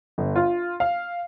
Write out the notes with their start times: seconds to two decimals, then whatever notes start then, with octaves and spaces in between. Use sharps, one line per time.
0.18 G1
0.36 F4
0.80 F5